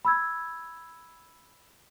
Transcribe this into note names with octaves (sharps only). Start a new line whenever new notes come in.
B5 E6 G#6